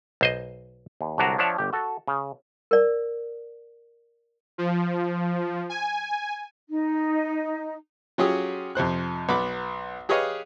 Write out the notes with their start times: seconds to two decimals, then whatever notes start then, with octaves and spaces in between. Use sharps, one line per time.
0.21 B1 C5 D#5
1.01 D#2
1.18 C2 D3 F#3 D4 F#4 A#5
1.38 F3 D4 C#5 E5 F#5
1.58 G1 G4
1.73 F#4 A4
2.08 C#3
2.71 A#4 D5
4.58 F3
5.69 G#5
6.69 D#4
8.18 F#3 C#4 F4 G4 G#4
8.75 F2 C3 C5 F#6
9.29 B1 B3 B5 D6
10.09 G4 G#4 B4 C#5 D#5 F5